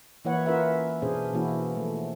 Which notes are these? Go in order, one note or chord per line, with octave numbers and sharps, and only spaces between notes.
E3 A#3 E4 B4 C#5 F#5
C#4 F4 A#4 B4 E5 F#5
B2 C#4 D4 G#4 C5
B2 E3 A#3 C#4 E4 F#4
F3 A3